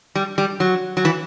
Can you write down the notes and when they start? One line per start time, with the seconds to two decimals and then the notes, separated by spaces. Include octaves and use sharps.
0.15 G3
0.38 G3
0.60 F#3
0.97 F#3
1.05 E3